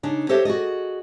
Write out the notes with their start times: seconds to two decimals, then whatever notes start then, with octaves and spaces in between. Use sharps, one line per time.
0.03 C#3 D4 D#4
0.29 G4 A4 C5 C#5 D#5 E5
0.45 F#4 G#4 D5 D#5